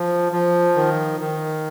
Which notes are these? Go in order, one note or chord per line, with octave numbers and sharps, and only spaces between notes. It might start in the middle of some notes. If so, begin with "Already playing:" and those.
Already playing: F3
F3
D#3
D#3